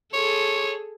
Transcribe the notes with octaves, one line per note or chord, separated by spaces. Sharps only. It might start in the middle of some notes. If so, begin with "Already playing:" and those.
G#4 A4 C#5